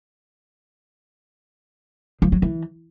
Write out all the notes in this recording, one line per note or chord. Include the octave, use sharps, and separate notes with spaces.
F3
F#3
E3